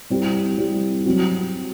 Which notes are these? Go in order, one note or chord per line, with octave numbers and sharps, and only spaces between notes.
G3 C4 E4 G4
G3 C4 E4 G4
F#3 C4 F#4